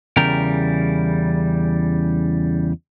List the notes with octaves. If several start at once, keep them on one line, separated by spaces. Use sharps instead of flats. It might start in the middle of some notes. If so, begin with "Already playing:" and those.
E2 C#3 G3 A#4 G5